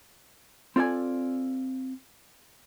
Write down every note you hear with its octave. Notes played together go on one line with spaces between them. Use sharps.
C4 F4 A4 D5 G#5